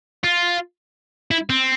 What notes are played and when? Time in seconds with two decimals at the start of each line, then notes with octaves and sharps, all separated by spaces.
0.24 F4
1.31 E4
1.50 C4